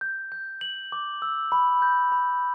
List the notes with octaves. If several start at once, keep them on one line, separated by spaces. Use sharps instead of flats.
G6
G6
F#7
D6
E6
B5
G6
B5